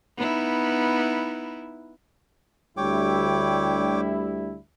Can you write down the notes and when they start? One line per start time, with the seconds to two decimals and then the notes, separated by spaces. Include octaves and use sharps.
0.17 B3 D#4 E4
2.77 D2 G3 E4 C#5 G5 D6